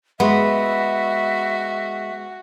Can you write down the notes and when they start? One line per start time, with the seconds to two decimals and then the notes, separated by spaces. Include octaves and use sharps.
0.20 G#3 B3 F#4 E5